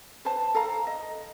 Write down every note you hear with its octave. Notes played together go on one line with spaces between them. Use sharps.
B4 C5 A5
A4 F5 A#5
D#5